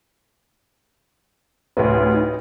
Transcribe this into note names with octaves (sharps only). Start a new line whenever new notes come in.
A1 D2 B4
D#4